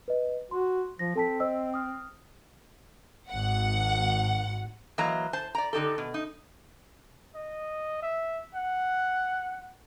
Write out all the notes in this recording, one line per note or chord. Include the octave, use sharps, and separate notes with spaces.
B4 D#5
F#4 C6
F3 A#6
C4 A4 A5 B6
C5 D#5 E6
D#6 F6
G#1 F#5
E3 F#3 A#3 D#5 A#5
C5 A5
D5 A#5
D3 D#4 G4 A4
B2
D#4
D#5
E5
F#5